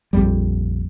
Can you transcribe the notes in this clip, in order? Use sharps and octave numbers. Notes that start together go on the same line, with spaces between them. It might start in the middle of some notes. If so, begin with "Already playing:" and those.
A#1 F2 G3